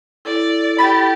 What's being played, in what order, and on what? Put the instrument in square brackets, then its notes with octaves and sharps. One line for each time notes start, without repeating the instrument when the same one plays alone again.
[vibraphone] E4 A4 [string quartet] D5
[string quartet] G4 [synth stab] B5 A6